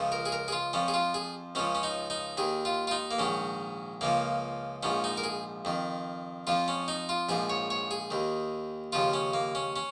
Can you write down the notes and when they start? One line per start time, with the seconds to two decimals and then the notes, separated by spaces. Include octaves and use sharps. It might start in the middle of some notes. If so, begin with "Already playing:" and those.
Already playing: C#2 C#3 F3
0.12 A#4
0.26 G#4
0.32 A#4
0.48 G#4
0.52 F4
0.73 F2 F3 C#4
0.88 G#4
0.94 F4
1.14 G#4
1.55 C#2 C#3 F3 C#4
1.75 C#4
1.83 D#4
2.10 D#4
2.37 D#2 D#3 G#4
2.65 F4
2.87 F4
2.91 D#4
3.11 A#3
3.19 A#1 G#2 D#3 C#4
4.01 C#2 C#3 F3 A#3
4.83 A#1 G#2 F3 C#4
5.04 D#4
5.17 A#4
5.24 G#4
5.65 F2 D#3
6.47 F2 F3 F4
6.68 C#4
6.88 D#4
7.09 F4
7.29 A#1 G#2 F3 G#4
7.50 C#5
7.70 C#5
7.91 G#4
8.11 D#2 D#3
8.93 D#2 C#3 F3 F4
9.13 C#4
9.34 A#3
9.55 C#4
9.76 C#4